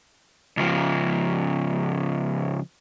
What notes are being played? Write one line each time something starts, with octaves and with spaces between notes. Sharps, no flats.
C#2 F3